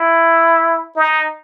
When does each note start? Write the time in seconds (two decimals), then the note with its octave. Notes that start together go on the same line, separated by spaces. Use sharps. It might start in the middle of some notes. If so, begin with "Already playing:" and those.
Already playing: E4
0.96 D#4